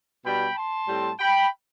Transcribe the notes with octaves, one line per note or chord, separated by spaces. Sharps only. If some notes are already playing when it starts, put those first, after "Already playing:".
B2 G3 D4 G5 B5
A5 C6
A2 G3 C4
G5 B5